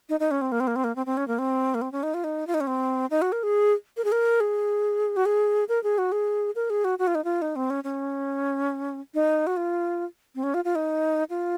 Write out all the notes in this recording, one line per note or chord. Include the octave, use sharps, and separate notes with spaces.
D#4
D#4
C#4
C4
A#3
C4
A#3
C4
A#3
C4
C4
C#4
A#3
C4
A#3
C4
C#4
D#4
F4
D#4
F4
D#4
C#4
C4
D#4
F#4
A#4
G#4
A#4
G#4
A#4
G#4
F#4
G#4
A#4
G#4
F#4
G#4
A#4
G#4
F#4
F#4
F4
D#4
F4
D#4
C4
C#4
C#4
D#4
F#4
F4
C4
C#4
F4
F4
D#4
F4